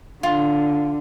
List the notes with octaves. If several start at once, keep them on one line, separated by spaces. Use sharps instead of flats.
D3 F4